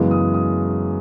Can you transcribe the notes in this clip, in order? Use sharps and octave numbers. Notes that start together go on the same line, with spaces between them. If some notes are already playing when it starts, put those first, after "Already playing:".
Already playing: F#2 C#3 E3 G#3 B3
D#6
D#6